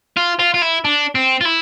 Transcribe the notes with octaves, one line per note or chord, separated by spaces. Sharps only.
F4
F4
F4
E4
D4
C4
F4
E4